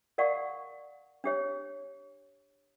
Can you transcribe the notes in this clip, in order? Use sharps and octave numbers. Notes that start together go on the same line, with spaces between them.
A#4 D5 F5 F#5 C#6
D4 G4 C#5